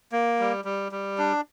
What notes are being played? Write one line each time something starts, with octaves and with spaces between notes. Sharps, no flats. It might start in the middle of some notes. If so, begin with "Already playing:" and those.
A#3
G3
G3
G3
D4